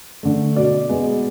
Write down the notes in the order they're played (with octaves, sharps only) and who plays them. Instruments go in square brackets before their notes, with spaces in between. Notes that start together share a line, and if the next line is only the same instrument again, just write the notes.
[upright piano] D3 A3
B2 D5
G#3 B3